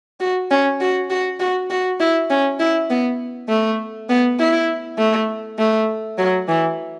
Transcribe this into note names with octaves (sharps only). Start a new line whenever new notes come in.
F#4
C#4
F#4
F#4
F#4
F#4
E4
C#4
E4
B3
A3
B3
E4
A3
A3
F#3
E3